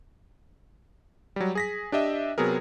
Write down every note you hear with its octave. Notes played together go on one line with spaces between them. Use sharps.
F#3 G3
G#4 A#6 B6
D4 G4 D#5 E5
C3 F#3 B3 G#4 A#4